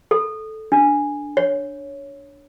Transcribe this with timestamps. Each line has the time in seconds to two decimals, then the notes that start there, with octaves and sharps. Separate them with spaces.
0.11 A4
0.72 D4
1.37 C#5